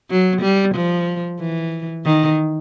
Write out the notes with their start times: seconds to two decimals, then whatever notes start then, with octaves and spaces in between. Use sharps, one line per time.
0.10 F#3
0.42 G3
0.75 F3
1.40 E3
2.05 D#3